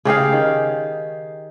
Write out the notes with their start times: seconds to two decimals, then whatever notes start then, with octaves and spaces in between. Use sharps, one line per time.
0.05 C#3 G4 G#4 F5
0.32 D#3